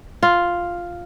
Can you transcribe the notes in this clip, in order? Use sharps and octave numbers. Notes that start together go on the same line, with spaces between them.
F4